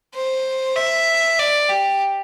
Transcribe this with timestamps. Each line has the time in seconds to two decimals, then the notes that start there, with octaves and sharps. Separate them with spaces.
0.15 C5
0.76 E5
1.39 D5
1.69 G4